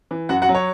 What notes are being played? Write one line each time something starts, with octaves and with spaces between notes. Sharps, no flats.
E3
F#2 F#4 F#5
F#4 F#5
F#3
C#5